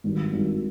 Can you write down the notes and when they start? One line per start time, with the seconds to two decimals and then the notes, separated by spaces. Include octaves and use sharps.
0.04 G#1 G2 D#3
0.33 G#1 G2 D#3